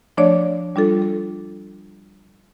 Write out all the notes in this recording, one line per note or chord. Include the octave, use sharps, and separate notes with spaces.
F3 A3 D4 C#5 D5
G3 D4 F4 A4
A4